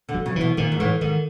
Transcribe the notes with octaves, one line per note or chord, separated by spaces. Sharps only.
D3
F#3
C#3
E3
B2
A#2 D#3
G#2
A2 E3
G#2 D#3